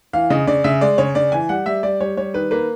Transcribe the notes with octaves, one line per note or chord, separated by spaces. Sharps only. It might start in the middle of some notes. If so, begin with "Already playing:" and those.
E3 F5
C#3 D#5
C#3 D5
C#3 E5
G#3 D5
C#3 C#5
C#3 D5
E3 G#5
G3 F#5
G3 E5
G3 D5
G3 C#5
G3 C#5
D#3 B4
A#3 B4